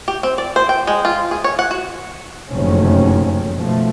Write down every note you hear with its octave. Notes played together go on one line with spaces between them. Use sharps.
G4
C4
D5
C5
G5
G#3
F4
G#4
C#5
F#5
F#4
F#1 F2 A2 C3 D#3 C#4
B2 F3 A3